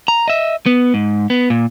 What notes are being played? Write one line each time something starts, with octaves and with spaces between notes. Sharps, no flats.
A#5
D#5 E5
B3
G#2
B3
A#2